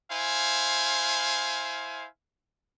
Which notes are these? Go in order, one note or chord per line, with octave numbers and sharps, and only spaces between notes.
E4 C5 F5 G#5